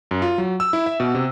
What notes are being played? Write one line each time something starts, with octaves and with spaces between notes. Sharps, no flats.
F#2
F4
F#3
E6
E4
E5
B2
C3